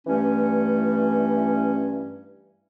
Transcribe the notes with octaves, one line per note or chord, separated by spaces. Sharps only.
G2 E3 A3 C#4